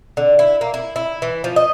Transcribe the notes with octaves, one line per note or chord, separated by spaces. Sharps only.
D3
E4
A#3
E4
E4
E3
F3
D#5